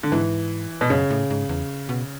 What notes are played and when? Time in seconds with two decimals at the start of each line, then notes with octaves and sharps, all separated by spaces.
0.03 D3
0.12 G#2 E3
0.81 B2
0.90 F#2 C#3
1.10 A2
1.30 G#2
1.49 E2
1.89 B2